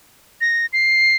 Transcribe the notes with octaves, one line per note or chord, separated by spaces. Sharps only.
A#6
C7